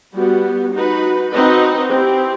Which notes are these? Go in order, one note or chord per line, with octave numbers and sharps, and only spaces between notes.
G3 B3 F#4
D#4 F#4 B4
C4 D#4 F#4 B4 D#5
C4 E4 G4